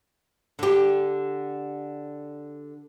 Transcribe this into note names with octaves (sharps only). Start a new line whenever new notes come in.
D3 G4